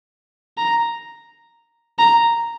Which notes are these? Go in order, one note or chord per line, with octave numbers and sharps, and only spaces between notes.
A#5
A#5